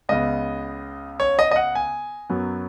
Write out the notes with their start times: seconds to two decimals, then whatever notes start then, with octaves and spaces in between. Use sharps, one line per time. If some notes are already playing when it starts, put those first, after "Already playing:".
0.09 C#2 C#3 B3 D#5
1.20 C#5
1.39 D#5
1.51 D#5
1.56 F#5
1.75 G#5
2.30 F#2 F#3 B3